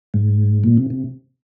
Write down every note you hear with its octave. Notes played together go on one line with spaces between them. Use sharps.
G#2
A#2
C3
C3